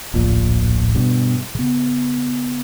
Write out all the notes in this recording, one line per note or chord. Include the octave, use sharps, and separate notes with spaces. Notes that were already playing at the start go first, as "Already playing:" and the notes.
D1 A#1 A#2
G2 B2
C#3 B3